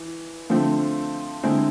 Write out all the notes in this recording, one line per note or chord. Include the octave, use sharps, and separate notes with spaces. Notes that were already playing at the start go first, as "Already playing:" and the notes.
Already playing: E3
D3 F3 A3 C4
D3 G#3 C4 E4